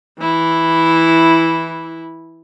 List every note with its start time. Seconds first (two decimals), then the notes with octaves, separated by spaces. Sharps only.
0.20 E3 E4